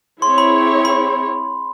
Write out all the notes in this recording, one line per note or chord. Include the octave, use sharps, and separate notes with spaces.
C4 E4 G#4 C#5 C6
B5
B5